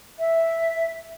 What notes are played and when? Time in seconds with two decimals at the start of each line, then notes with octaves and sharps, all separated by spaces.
0.18 E5